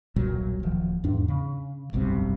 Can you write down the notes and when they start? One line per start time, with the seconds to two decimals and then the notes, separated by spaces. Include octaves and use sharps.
0.16 D#1 B1 A#2 F#3
0.63 D1 D#3 F3
1.04 E2 G#2 D4
1.28 C#3
1.93 F1 B1 G2 C3